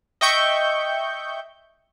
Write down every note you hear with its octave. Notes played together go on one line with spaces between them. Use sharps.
D#5 E5 G5 C#6 G6